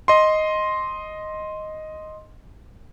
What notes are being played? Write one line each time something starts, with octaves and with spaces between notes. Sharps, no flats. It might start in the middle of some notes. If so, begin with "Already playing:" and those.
D#5 C6